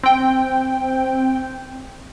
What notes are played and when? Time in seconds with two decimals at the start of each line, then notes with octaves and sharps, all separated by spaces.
0.03 C4 G5